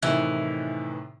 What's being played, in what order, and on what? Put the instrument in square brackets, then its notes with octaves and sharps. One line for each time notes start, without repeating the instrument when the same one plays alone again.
[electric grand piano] A2 C3 D#3 [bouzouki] E3